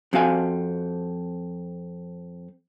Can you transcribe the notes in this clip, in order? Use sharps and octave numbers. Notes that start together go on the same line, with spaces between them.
F2 C4 F#4 F5 G#5